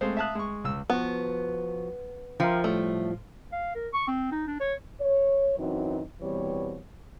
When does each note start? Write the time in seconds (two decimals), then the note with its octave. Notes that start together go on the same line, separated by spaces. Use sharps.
0.01 G#3 A3 C4 C5 F5
0.17 E5 F5 A5 D#6 F#6
0.35 G#3 C#6
0.64 C#2 E6
0.90 F3 B3 F#4
2.40 F3 A#4 E5 G5
2.64 A2 G3 A3
3.52 F5
3.75 A#4
3.94 C#6
4.08 C4
4.32 D#4
4.47 D4
4.60 C#5
5.01 C#5
5.59 F#2 E3 F#3 C4 D#4
6.21 E2 B2 E3 G3 C4 C#5